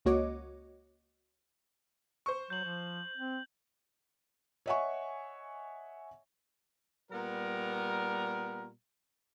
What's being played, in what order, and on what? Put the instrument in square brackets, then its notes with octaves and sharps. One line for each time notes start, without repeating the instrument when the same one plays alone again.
[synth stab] C#2 A#3 F#4 C#5 D#5 D6
[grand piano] C5 C#6
[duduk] F#3 [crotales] G6 F#7
[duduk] F3
C4
[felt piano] C#5 D#5 E5 F#5 G#5 C#6
[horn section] A#2 G3 B3 A#4